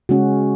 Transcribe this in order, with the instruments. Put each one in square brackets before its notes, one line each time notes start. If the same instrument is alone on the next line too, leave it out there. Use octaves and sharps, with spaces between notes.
[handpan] C#3 G#3 C#4 F#4